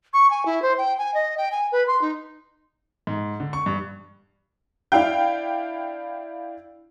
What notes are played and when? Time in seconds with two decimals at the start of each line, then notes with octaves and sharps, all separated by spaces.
0.13 C#6
0.30 G#5
0.46 E4
0.62 C5
0.78 G5
0.98 G#5
1.14 D#5
1.37 G5
1.52 G#5
1.72 B4
1.87 C6
2.02 D#4
3.07 G#2
3.40 D3
3.53 C#6
3.66 G2
4.92 D4 E4 F5 G5